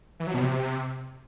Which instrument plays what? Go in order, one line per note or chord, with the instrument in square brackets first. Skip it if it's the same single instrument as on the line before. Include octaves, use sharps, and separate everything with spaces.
[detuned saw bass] E3
F#3
B2
C3